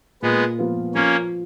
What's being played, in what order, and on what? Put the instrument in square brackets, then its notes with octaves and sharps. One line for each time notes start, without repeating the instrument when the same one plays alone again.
[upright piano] A#2 [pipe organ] G#3 B3
[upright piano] F3 B3 F4 B4
[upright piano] F3 [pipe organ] A#3 C#4